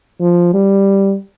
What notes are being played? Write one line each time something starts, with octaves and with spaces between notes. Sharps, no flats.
F3
G3